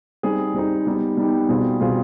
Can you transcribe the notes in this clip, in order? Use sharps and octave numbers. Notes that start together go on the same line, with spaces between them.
G3 C4 D#4 G#4
G3 C4 D#4 G#4
G3 B3 D#4 G4
G3 B3 D#4 G4
B2 G3 C4 F4 G#4
B2 G3 C4 F4 G#4